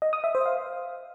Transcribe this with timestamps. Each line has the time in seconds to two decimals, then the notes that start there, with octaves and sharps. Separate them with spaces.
0.02 D#5
0.13 D#6
0.24 E5
0.35 C5
0.46 F5